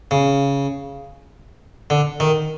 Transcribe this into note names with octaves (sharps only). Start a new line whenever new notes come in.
C#3
D3
D#3